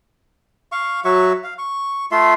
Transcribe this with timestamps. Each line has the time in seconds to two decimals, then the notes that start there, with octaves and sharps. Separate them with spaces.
0.72 F5 C#6
1.05 F#3 F#4 E5 C#6
1.44 F5
1.58 C#6
2.12 A3 F4 E5 C6